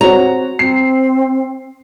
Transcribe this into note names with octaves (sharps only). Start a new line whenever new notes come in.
C4 F#4 C#5 A#5
C4 C7